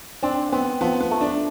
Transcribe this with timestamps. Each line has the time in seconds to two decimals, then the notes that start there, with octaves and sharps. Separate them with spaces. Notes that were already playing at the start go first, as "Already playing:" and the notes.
0.23 C4 D4
0.52 B3 C4
0.81 F3 B3
1.01 B3
1.11 A3
1.21 D4